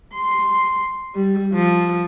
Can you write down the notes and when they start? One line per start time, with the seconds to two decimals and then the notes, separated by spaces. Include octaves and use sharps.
0.15 C6
1.15 G3
1.53 F3